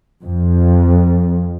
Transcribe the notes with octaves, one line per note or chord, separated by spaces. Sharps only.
F2